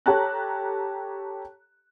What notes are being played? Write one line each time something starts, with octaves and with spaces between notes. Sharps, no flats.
G4 A4 C#5 A5 A#5 F#6